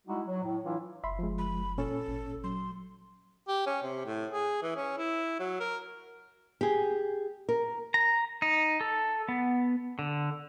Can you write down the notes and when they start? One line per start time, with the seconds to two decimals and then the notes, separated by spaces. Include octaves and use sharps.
0.07 G3 G#3 D#4 E4 F#4
0.27 F#3
0.44 A2
0.65 E3 F#3 D4 E4 F4
1.04 F#1 E5 B5 C6
1.19 F3 G#3
1.38 B5
1.78 A#2 C#4 A4
2.08 G#1
2.44 F#3 C6
3.48 G4
3.66 C#4
3.82 C3
4.06 A2
4.32 G#4
4.63 E3
4.76 C#4
4.98 E4
5.40 F#3
5.60 A#4
6.61 G4 G#4
7.49 A#4
7.94 A#5
8.42 D#4
8.81 A4
9.29 B3
9.99 D3